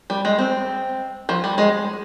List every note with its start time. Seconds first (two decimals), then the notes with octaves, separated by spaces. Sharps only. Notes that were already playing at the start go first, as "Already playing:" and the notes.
0.10 G3
0.25 G#3
0.38 C4
1.29 F3
1.44 G3
1.58 G#3